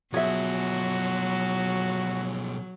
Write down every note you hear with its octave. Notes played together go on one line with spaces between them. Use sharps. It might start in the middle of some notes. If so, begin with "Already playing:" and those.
B2 F3 F#3 F#4 G#4 E5